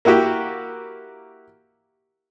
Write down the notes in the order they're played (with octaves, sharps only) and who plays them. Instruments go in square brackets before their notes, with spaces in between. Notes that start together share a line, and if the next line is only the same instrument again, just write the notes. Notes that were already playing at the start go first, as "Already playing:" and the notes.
[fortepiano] A#3 E4 F#4 G4